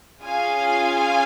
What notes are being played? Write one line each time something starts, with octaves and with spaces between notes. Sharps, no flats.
C#4 F4 G#4 F5 G#5